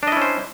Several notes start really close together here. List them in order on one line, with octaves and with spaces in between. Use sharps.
D4 D#5 E4 C#4 C5